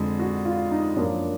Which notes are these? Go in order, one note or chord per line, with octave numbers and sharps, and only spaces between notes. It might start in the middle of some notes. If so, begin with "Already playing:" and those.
Already playing: F2 D3 G#3
F#4
F4
D#4
F#2 F3 A#3 D4